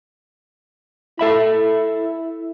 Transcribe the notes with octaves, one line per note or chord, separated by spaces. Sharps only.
E4 A4 E5 B5